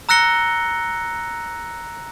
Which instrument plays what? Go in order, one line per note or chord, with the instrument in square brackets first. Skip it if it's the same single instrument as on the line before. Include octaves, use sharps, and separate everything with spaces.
[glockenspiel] A#5 E6 F#6 A#6 C#7 G7